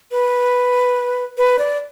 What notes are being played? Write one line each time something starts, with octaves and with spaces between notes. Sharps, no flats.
B4
B4
D5